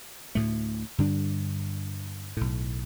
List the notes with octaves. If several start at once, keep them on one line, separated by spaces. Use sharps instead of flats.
D2 A2 A3
G2 D3 G3 D4
B1 A2